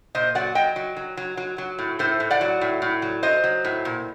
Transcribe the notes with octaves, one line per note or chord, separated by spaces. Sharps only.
A#2 C5 D#5
F#3 D5 F#5
F#3 D#5 G5
F#3
F#3
F#3
F#3
F#3
A2
A2 A4 C5
A2
D5 F#5
F#3
A2
A2
F#3
F#3 C5 D#5
F#3
A2
A#2